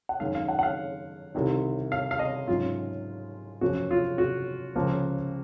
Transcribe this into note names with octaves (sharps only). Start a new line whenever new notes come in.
F#5
F#2 D#3 G#3 C#4 F5
F5
F#5
F#5
F5
C2 C3 D#3
F5
F5
D#5
G#2 F#3 C#4 F4
F#2 F3 A#3 C#4 F#4
F4
F#4
C#2 C#3 F3 A#3